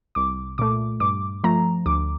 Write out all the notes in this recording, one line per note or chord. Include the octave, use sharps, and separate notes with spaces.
C2 D6
A#2 A3 D6
G2 D6
F3 A3 A#5
D2 D6